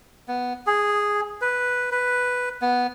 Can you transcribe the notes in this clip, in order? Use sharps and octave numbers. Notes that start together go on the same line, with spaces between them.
B3
G#4
B4
B4
B3